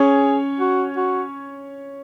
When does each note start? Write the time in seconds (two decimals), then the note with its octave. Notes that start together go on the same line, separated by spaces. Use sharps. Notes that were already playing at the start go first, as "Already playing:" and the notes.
Already playing: C#4 G#4 C#5
0.60 F#4
0.97 F#4